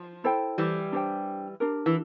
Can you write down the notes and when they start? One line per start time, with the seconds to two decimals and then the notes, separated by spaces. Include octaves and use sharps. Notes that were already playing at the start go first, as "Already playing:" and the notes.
Already playing: F3
0.24 E4 A4 C5 G5
0.58 E3 G3
0.92 D4 G4 C5 G5
1.60 D4 G4 A#4
1.86 E3